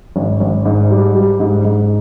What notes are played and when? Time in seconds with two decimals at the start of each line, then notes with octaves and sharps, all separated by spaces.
0.16 G#1
0.40 G#1
0.65 G#2
0.91 G3
1.15 G3
1.40 G#2
1.65 G#2